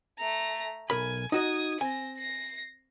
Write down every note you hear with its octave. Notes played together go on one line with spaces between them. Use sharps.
A3 A#5
B1 A#4 G#5 B5
D#4 F#4 D#5 D#6 G#6
C4 G#5 A#6
A#6 C7